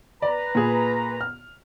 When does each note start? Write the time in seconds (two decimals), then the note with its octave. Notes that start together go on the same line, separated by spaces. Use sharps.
0.22 B4 D5 A#5
0.55 A#2 G#4
1.21 F6